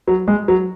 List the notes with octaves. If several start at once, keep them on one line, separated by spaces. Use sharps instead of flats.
F#3
G#3
F#3